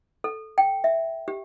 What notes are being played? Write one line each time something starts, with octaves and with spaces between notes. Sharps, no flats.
A4
G5
E5
G4